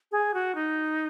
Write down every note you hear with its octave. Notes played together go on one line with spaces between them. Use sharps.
G#4
F#4
D#4